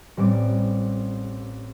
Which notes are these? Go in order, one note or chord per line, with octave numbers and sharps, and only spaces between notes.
A1 G3 C4 D6